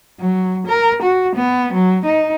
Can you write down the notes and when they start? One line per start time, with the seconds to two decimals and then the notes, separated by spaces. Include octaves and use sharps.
0.20 F#3
0.67 A#4
1.03 F#4
1.36 B3
1.73 F#3
2.06 D#4